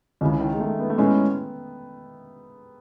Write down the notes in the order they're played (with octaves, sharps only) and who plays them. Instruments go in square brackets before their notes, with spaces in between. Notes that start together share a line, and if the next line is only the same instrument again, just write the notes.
[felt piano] C#2 C#3 E3
[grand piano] D#3
G#3
A3
B3
A3
[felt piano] A2 G#3 C#4 [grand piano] B3